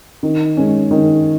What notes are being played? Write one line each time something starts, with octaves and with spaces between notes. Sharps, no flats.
D#3
G#3 C#4
D#3